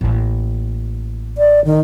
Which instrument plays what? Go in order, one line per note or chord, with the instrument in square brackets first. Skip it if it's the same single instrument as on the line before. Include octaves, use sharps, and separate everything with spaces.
[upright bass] A1 A#3
[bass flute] D5
D#3